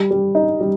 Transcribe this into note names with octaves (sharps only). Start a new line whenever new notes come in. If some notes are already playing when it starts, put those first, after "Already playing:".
Already playing: G3
G3
D#4
G3